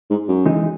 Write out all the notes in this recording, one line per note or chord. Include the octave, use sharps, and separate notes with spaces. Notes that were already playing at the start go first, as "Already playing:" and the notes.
G#2
F#2
E3 G#3 D#4